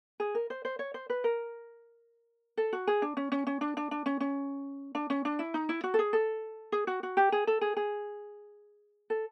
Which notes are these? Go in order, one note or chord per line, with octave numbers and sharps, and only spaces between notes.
G#4
A#4
C5
C5
C#5
C5
B4
A#4
A4
F#4
G#4
D4
C#4
C#4
C#4
D4
D4
D4
C#4
C#4
D4
C#4
D4
E4
D#4
E4
F#4
A4
G#4
A4
G#4
F#4
F#4
G4
G#4
A4
G#4
G#4
A4